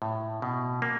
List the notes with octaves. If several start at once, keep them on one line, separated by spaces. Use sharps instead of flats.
A2
B2
A#3